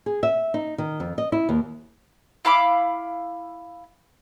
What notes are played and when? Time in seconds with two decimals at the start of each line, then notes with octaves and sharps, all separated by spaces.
0.06 G#4
0.23 E5
0.54 D#4
0.78 D#3
1.00 F2
1.18 D#5
1.32 E4
1.49 D#2
2.45 E4 F5 B5 D6